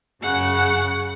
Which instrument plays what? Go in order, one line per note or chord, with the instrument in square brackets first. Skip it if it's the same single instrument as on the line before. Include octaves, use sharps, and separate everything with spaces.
[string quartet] F#2 C#3 F#5